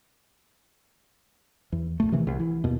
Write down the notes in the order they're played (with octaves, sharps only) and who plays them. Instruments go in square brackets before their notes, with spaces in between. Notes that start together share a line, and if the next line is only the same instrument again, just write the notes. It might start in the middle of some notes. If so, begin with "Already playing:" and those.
[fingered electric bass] E2
A#1 A3
C3 D#3 E3
C2
E3
D#2 B2